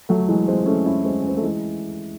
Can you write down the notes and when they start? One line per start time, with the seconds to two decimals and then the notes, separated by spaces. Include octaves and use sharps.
0.09 F#3 A3
0.28 E3 G#3
0.48 G#3 C4
0.66 A3 C#4
0.86 C#4 E4
1.05 G#3 C4
1.22 C#4
1.29 C4
1.36 A3
1.43 E3 G#3